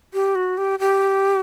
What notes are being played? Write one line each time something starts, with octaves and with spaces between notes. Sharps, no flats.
G4
F#4
G4
G4